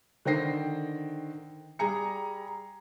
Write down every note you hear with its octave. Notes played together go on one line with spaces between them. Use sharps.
D3 D#3 C5 G5 A#6 C7
G3 G#4 G#5 A#5 C#7